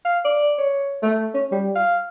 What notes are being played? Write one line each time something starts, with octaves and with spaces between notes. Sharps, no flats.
F5
D5
C#5
A3
C#4
G3
F5